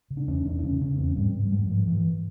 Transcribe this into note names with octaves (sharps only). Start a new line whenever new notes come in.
C#3
D4
E2 C#4
E2 D4
D4
C#3 C#4
C#3 C#4
E2 C4
G#2 G3
G#2
G3
G#2 F#3
G#2 F3
G#2 E3